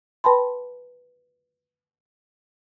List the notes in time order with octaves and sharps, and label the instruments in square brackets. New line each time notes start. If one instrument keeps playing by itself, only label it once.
[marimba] B4 G5 A5 B5 C6